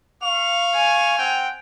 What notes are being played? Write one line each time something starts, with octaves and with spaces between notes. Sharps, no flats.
F5 C#6 F7
G#5
C4 F#5 G5